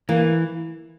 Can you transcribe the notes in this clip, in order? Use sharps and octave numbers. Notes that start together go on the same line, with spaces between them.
E3 A#3